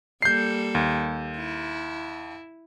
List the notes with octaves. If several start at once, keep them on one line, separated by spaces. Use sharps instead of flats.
G3 A#3 A4 G6 C7
D#2
E4